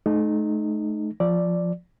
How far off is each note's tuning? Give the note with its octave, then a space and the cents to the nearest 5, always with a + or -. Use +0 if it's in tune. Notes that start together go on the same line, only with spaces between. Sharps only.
A3 -35 D#4 -20
F3 +0 D5 +0